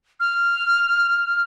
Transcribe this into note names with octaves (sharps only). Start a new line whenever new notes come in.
F6